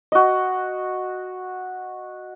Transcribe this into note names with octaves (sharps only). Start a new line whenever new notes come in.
F#4 D#5